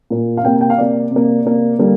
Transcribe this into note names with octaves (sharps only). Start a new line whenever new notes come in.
A#2 A#3
F5
C3 A#3 G5
G5
F5
C3 A#3 D5
C3
A#3
C3 A#3
D3 G3 A#3